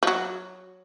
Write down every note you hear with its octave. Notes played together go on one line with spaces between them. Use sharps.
F3
F#3